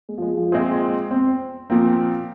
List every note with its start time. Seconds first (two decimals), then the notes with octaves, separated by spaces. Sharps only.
0.09 G#3
0.18 F3
0.22 G#3
0.37 F3
0.52 A#2 G#3 C4 G#4 C5
1.11 C4
1.70 A#2 F3 A#3 C4